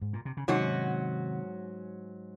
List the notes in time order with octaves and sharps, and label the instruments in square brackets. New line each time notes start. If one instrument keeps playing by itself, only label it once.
[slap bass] G#2
A#2
C3
C#3
[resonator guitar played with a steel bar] G#2 F#3 C#4 F#4 [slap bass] C3 D#3